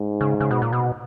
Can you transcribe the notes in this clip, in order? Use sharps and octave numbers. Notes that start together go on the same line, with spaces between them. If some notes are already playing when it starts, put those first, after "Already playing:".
Already playing: G#2
C#3
C#3
B2
A#2
B2